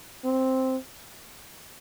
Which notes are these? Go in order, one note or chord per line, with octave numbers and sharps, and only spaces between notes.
C4